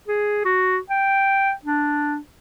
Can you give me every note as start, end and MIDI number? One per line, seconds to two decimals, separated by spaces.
0.08 0.42 68
0.45 0.78 66
0.90 1.52 79
1.65 2.17 62